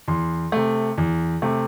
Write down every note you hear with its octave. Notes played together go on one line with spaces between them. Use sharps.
E2 C6
C3 A3
E2
C3 A3